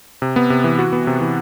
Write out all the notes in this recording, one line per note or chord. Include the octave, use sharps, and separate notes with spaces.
C3
B3
C3
E3
F#4
B3
C3
E3